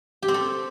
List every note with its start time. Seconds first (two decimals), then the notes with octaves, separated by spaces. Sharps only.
0.22 G4
0.28 C4
0.34 A4